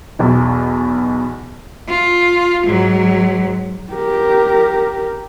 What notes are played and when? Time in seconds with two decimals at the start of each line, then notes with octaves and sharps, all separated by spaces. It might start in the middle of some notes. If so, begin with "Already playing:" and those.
0.19 B1 E2 B2
1.88 F4
2.66 G#2 F#3
3.93 G4 A#4